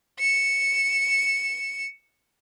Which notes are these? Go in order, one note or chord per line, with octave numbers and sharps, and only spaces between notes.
C#7 E7